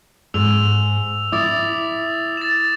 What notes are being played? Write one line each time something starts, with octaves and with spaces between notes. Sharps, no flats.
G#2 E6 F7
E4 D6 D#6 A6
A6 E7